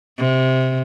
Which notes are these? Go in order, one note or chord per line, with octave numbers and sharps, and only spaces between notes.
C3